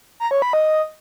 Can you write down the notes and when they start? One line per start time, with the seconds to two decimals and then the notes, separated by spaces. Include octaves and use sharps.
0.20 A#5
0.31 C#5
0.42 B5
0.53 D#5